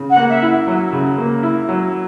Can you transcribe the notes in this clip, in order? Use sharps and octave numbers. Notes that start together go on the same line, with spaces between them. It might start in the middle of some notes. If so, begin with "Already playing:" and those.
Already playing: C#3
F#5
A#3
E5
E4
F#3
C#3
A#3
E4
F#3